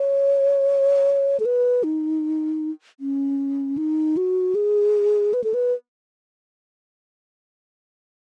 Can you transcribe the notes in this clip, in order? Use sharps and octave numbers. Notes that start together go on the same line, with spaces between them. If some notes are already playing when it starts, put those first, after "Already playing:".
Already playing: C#5
A4
B4
D#4
C#4
D#4
F#4
G#4
B4
A4
B4